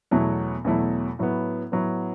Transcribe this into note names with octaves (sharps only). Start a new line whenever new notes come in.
E2 B2 F#3 A3 E4
E2 B2 F#3 A3 E4
A2 F#3 B3
A2 F#3 B3